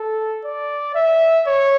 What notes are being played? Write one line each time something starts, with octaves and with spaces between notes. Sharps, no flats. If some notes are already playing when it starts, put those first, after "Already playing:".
Already playing: A4
D5
E5
C#5